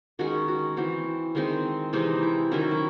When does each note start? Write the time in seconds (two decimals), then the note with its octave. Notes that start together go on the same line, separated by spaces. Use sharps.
0.19 D#3 G#3 C#4 F#4
0.48 F#4
0.77 E3 C4 F#4
1.35 D#3 G#3 C4
1.93 C3 E3 G#3 C4 D#4
2.23 E4
2.51 D#3 F#3 C#4 E4
2.61 F#4
2.71 E4